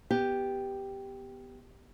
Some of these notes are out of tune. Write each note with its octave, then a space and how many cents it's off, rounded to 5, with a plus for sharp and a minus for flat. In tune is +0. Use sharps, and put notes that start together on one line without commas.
B3 +0 G4 +0